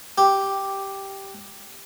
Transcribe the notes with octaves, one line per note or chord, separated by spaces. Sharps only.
G4